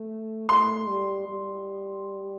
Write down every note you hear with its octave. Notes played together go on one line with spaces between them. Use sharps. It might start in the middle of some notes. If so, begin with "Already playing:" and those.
Already playing: A3
A3 C6
G3
G3